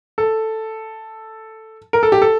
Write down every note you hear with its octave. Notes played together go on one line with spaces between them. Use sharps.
A4
A#4
A4
G4
A4